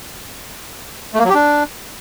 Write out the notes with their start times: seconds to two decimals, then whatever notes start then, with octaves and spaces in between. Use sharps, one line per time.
1.14 A3
1.19 A#3
1.24 F#3
1.29 G4
1.34 D4